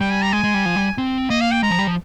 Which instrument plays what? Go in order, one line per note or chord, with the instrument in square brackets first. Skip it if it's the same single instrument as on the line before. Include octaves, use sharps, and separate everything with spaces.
[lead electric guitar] G3 [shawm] G5
[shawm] G#5
A#5
[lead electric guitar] G#3 [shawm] G#5
[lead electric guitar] G#3
G3
F3
G3
C4
[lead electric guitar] A#3 [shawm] D#5
[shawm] F5
G5
[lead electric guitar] G#3 [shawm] A#5
[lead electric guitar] F3
G3
F3